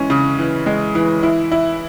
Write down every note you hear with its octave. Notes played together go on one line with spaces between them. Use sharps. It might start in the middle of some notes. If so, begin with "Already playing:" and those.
Already playing: E3 G#3 C#4
C#3
E3
G#3
E3
E4
E4